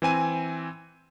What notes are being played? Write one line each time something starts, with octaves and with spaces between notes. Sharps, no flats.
E3 C4 G#5 D#7